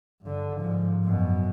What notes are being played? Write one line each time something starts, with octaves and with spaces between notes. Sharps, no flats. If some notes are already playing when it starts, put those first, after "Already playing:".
G2 D3
G#2 F3
F#2 B2